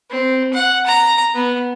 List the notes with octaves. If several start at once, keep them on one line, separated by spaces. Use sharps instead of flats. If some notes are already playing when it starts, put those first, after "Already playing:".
C4
F#5
A#5
B3